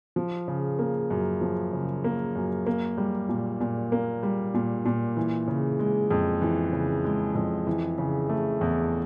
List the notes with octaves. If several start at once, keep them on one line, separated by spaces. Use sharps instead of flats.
F3
C#3
A#3
F#2
F3
C#3
A#3
F#2
A#3
G3
A#2
A#2
A#3
G3
A#2
A#2
E3
C#3
G#3
F2
E3
C#3
G#3
F2
E3
C#3
A3
E2